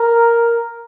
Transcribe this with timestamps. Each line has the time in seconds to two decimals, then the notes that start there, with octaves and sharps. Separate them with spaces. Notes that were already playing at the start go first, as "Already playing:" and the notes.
Already playing: A#4